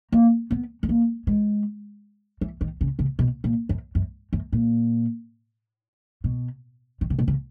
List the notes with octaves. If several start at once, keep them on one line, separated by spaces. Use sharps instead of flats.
A#3
B3
G#3
A#3
G#3
E3
D#3
C#3
C#3
B2
A#2
F#2
F#2
F#2
A#2
B2
D#3
C#3
B2
C#3